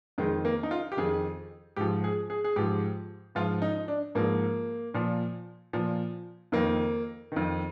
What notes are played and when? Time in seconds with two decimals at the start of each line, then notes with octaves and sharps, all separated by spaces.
0.18 F2 D#3 G#3
0.45 A#3
0.63 D#4
0.71 F4
0.92 G4
0.97 F2 D#3 G#4
1.76 G#2 F3 G4
2.04 G#4
2.30 G#4
2.44 G#4
2.56 G#2 F3 G4
3.35 G#2 F3 F4
3.62 D#4
3.88 D4
4.15 G#2 F3 A#3
4.94 A#2 F3
5.73 A#2 F3
6.52 F2 D#3 A#3
7.32 F2 D#3